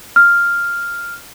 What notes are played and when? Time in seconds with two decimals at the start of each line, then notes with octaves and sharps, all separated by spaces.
0.16 F6